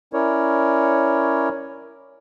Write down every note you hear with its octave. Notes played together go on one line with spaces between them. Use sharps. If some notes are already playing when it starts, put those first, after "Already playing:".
C#4 E4 A#4 C#5 D5